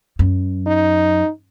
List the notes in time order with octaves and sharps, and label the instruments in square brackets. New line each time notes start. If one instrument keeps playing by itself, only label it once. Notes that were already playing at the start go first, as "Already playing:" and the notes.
[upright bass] F#2
[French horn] D#4